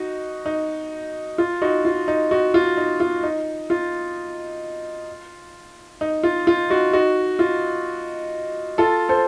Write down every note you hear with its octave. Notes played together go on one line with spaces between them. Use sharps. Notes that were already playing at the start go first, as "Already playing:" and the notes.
Already playing: D#4 F#4
D#4
F4
D#4 F#4
F4
D#4
D#4 F#4
F4
D#4
F4
D#4
F4
D#4
F4
F4
D#4 F#4
D#4 F#4
F4
F4 A4
A4 C5